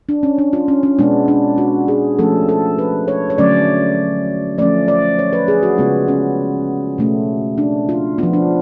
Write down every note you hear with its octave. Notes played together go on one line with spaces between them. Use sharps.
D4
C#4
D4
F4
C#4
C#4
B2 G#3 B3 D4
D4
F#4
G#4
F3 A3 C#4 A4
A4
B4
C#5
C#5
D3 F#3 A3 C#4 D5
F3 A3 C#4 D5
D5
C#5
B4
G#4
F#4
C#3 G#3 B3 F4
C#4
B2 A3 C#4
D4
F4
F3 B3 F4
D4